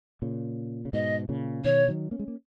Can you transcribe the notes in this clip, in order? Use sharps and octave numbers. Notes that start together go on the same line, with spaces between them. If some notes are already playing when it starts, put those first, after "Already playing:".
A#2 C#3
C#3
G#2 B2 D#5
A#2 C#3
B2 D#3 C#5
D#3 F#3
A#3 C#4
G#3
A#3